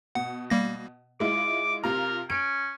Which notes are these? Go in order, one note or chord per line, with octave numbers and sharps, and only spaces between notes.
B2 F#5
G3 A#3 A#6
G#3 E4 F4 D6
C3 F4 A#4 A#5
C#4 D7